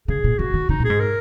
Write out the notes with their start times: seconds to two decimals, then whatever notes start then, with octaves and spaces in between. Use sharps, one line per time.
0.08 C#3 G#4
0.24 A#2
0.38 C#3 F#4
0.54 D#3
0.69 C#3 D#4
0.80 A#2
0.85 G#4
0.90 G#2
1.00 A#4